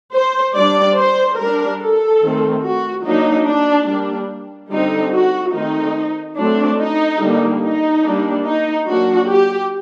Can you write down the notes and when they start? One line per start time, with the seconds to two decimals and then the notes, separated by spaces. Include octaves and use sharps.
0.13 C5
0.55 G3 D4 D5
0.97 C5
1.38 G3 D4 A#4
1.80 A4
2.21 D#3 A3 C4
2.64 F#4
3.05 F#3 A#3 D4 D#4
3.46 D4
3.87 G3 A#3 D4
4.71 D3 G3 C4 D#4
5.13 F#4
5.54 D#3 A3 C4 D#4
6.37 F#3 A3 C4 D4
6.79 D#4
7.20 D3 G3 A#3 D4
7.62 D#4
8.03 G3 A#3 D4
8.45 D#4
8.87 F#3 A#3 D4 F#4
9.29 G4